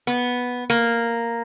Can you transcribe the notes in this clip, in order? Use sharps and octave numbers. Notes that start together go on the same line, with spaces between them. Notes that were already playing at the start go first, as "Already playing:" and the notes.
B3
A#3